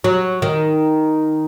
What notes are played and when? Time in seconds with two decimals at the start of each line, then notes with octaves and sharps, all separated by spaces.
0.04 F#3
0.42 D#3